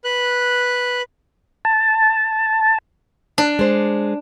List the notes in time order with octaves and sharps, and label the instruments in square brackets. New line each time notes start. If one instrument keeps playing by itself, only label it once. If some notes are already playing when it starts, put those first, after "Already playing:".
[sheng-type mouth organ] B4 F#6
[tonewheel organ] A5
[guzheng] D4
[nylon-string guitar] G#3 C5